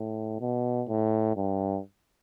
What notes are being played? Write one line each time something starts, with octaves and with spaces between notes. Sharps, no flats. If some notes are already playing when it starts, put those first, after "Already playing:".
Already playing: A2
B2
A2
G2